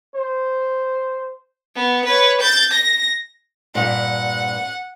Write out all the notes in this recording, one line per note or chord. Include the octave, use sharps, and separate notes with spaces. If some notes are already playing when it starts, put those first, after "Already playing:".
C5
B3
B4 C#5
G6 A6
A#6
G2 A#2 F#5